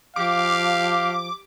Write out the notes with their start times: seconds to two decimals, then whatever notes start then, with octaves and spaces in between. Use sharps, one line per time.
0.16 F3 G4 F5 D6